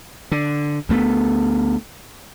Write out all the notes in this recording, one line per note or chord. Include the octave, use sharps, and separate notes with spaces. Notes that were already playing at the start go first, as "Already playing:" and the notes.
D3
D2 A3 B3